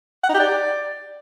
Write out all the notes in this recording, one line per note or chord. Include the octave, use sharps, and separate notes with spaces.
F#5
D#4
G4
D5